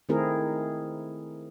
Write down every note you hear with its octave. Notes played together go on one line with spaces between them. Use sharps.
D#3 A3 C4 E4 G#4 A#4